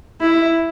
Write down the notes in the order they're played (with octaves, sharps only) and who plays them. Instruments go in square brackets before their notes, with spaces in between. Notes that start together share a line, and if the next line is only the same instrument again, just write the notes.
[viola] E4